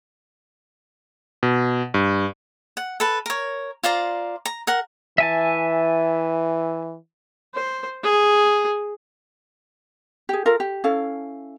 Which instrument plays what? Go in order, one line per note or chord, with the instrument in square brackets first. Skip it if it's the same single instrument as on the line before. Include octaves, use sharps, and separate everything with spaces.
[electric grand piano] B2
G2
[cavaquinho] F#5
A4 B4 A5
A#4 C#5
F4 C5 D5 A#5
A#5
A#4 F#5
[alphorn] E3 [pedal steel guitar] E5 G#5 A5
[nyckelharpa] C5
G#4
[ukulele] G4 G#4
F4 A4 A#4 F5
G4
C#4 E4 A4 F5